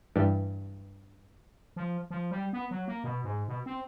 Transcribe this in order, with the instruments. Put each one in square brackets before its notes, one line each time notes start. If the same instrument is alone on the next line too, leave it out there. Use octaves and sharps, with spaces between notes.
[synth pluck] G2 E3 G3
[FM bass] F3
F3
G3
B3
F#3
A#3
B2
G#2
B2
C4